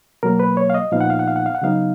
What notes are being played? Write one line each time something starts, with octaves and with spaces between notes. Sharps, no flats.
B2 F#3 A#3 A#4
B4
C#5
F5
D#5
A#2 F3 B3 D#4 F5
F#5
F5
F#5
F5
F#5
F5
F#5
C#3 F#3 B3 D#4 F5